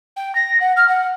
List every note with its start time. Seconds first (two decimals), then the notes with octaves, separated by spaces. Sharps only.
0.17 G5
0.35 A#6
0.60 F#5
0.77 F6
0.88 F#5